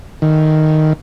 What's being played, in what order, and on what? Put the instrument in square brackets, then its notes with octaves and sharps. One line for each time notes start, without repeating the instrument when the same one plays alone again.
[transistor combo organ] D#3